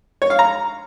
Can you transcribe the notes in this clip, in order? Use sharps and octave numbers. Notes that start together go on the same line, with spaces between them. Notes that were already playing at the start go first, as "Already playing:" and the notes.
C#5
F5
A#5